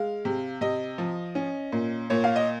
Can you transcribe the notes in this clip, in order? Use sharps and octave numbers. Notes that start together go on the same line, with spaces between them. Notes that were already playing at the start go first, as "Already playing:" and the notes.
Already playing: G#3 F5
C3
C3 D#5
F3
C#4
A#2
A#2 C#5
F5
D#5